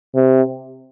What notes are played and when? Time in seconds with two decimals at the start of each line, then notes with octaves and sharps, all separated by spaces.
0.15 C3